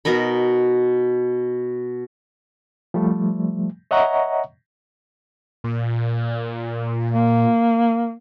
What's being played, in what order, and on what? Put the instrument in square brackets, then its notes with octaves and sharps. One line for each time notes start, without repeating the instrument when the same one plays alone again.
[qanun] B2 D#4 A#4 B5
[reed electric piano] F3 G3 A3
C#5 D#5 E5 F#5 A#5 C#6
[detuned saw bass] A#2
[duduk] A#3